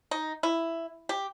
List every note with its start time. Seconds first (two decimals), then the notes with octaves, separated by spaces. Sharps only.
0.11 D#4
0.43 E4
1.09 G4